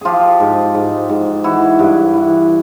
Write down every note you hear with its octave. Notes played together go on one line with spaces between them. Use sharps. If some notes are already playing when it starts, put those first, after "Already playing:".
F3 F4 G4 G#4
G#2
G#2
G#2
E3 E4 F#4
G2
E3